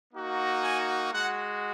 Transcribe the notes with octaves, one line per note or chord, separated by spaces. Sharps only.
A#3 D#4 F#4
G#5
G#3 F#4 F#5